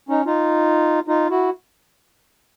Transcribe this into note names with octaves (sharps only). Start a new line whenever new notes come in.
C#4 D#4
D#4 F4
D#4 F4
E4 F#4